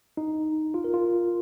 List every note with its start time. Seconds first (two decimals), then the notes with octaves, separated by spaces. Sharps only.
0.17 D#4
0.74 F4
0.84 A#4
0.94 F4